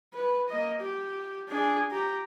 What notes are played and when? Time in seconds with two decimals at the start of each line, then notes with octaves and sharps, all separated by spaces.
0.13 B4
0.48 A#3 D#5
0.80 G4
1.49 D4 G#4
1.91 G4 A#5